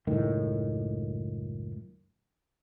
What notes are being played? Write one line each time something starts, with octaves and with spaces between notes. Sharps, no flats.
F#1 C#2 A2 D#3